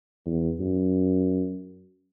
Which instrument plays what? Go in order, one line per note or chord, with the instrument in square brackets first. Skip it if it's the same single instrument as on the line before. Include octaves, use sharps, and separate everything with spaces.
[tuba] E2
F#2